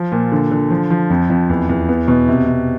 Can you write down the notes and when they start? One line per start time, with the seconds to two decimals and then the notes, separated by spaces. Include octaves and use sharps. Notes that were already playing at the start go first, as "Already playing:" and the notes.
Already playing: F3
0.12 A#2
0.32 D3
0.51 D3
0.70 F3
0.90 F3
1.10 F2
1.30 F2
1.49 E2
1.69 E2
1.89 B3
2.08 B2
2.28 C3
2.47 C3